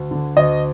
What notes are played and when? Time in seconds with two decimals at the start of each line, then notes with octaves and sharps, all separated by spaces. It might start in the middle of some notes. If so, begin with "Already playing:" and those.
Already playing: D2
0.11 D3
0.37 D2 D#5